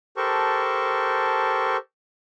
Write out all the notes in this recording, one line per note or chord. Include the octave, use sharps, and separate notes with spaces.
G4 A4 A#4 C5 A5 C#6